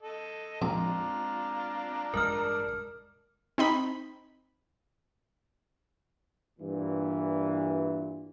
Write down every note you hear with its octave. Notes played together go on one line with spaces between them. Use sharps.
A4 D#5
A#1 A#2 G#3 C4 D4 F4 A#5 D6
A1 G2 G#3 A#4 F6
C4 D#4 B5
G2 A#2 E3